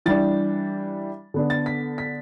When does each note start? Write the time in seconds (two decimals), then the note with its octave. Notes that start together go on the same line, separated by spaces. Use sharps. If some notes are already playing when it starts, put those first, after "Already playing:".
0.06 E3 G3 D4 A6
1.34 D3 B3 D4
1.50 A6
1.66 B6
1.98 B6